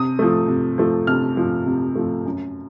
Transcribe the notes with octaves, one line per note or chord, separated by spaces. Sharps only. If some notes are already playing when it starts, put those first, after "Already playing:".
Already playing: C3 D#6
F3 A3
C3
F3 A3
C3 F6
F3 A3
C3
F3 A3
F#2